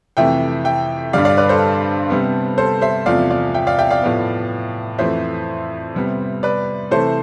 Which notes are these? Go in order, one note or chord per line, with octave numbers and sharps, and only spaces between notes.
F2 C3 E3 A3 E5 G5
E5 G5
G2 D3 G3 D5 F5
D5 F5
B4 D5
A4 C5
C3 G3 B3
A4 C5
C5 E5
E2 C3 F3 A3 D5 F5
D5 F5
E5 G5
D5 F5
E5 G5
D5 F5
A2 F3 B3
F2 E3 A3 C5 E5
C3 G3 B3
B4 D5
C3 E3 A3 A4 C5